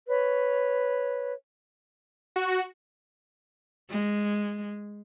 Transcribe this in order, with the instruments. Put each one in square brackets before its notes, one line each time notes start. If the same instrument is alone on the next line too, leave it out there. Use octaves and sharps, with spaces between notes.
[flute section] B4 C#5
[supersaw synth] F#4
[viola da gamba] G#3